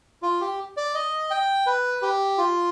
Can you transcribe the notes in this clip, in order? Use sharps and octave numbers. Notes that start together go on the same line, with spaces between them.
F4
G4
D5
D#5
G5
B4
G4
F4